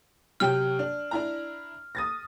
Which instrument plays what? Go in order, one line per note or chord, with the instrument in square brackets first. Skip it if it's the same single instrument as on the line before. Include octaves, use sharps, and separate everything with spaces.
[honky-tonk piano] C3 F#3 G5 [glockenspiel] F6
[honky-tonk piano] D4
D4 E4 A#5
D#6 A6 A#6